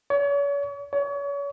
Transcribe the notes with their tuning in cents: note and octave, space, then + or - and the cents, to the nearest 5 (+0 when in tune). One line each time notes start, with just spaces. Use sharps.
C#5 +40
C#5 +35